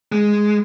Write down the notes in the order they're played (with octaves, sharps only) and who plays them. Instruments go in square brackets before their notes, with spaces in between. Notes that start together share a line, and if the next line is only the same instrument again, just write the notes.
[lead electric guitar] G#3